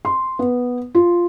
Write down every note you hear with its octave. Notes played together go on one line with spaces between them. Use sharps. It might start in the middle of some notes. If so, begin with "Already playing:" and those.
C6
B3
F4